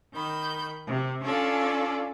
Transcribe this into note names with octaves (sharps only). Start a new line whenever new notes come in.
D#3 B5 G6
C3
C#4 D4 F4 A4 C#5 D5